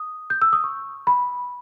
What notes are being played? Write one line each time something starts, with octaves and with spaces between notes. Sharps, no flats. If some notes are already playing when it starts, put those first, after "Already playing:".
Already playing: D#6
G6
E6
D#6
C#6
B5